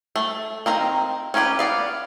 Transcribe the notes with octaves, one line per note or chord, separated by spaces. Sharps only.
A3
D#3 C4 A#5
C#4 D#4 F4 G4 B4
B3 D5 F5